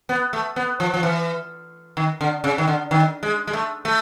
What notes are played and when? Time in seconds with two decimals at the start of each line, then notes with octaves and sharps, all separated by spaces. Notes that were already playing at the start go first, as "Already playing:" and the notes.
0.09 B3
0.33 A3
0.56 B3
0.80 F3
0.94 F3
1.03 E3
1.97 D#3
2.21 D3
2.44 C#3
2.58 D#3
2.68 D3
2.91 D#3
3.23 G#3
3.47 G#3
3.53 A3
3.85 A3